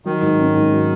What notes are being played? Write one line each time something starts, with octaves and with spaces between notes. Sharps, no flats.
D#3 F#3
G#2
C#4
G#2
F#3